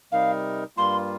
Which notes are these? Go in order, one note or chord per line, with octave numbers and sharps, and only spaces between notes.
C3 G3 D#4 A#4 F5
G2 G3 A#3 F4 C6